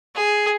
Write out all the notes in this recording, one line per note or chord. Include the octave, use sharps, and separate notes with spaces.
G#4